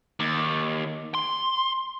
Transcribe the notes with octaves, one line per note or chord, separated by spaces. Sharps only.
D#2
C6